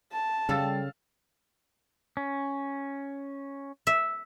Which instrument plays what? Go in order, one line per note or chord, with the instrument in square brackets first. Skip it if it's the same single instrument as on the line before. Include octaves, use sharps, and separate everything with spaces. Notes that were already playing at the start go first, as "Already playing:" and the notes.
[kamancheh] A5
[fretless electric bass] C#3 [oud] G3 A4 [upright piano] F5 E6 A6
[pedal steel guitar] C#4
[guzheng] E5